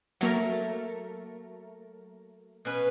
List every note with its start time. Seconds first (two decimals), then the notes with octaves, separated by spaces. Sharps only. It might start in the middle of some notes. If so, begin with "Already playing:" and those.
0.21 F#3 A3 A#3 A#4
2.65 B2 C#4 B4